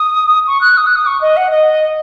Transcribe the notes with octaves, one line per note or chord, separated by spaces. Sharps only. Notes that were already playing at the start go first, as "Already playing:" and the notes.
Already playing: D#6
C#6
F#6
D#6
F#6
D#6
C#6
D#5
F#5
D#5